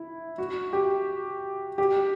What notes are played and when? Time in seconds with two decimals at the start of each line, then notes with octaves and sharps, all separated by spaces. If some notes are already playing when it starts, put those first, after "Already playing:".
Already playing: E4
0.38 F#4
0.73 G4
1.78 G4